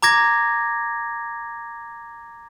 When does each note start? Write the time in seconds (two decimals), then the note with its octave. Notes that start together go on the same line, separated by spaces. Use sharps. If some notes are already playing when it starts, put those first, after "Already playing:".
0.03 A#5 D6 G#6 A#6